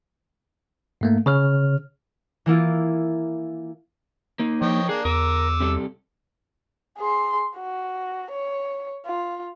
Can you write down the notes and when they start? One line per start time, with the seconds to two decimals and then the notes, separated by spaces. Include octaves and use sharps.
1.01 G#2 A3 A#3
1.26 C#3 C#5 F6
2.46 E3 A#3 E4 F4
4.39 A#3 D#4
4.62 F3 C#5 D#5 G5
4.89 A#3 D4 G#4
5.05 E2 A#4 D6 E6
5.60 C3 G3 A4
6.98 G#4 C6
7.57 F#4
8.32 C#5
9.06 F4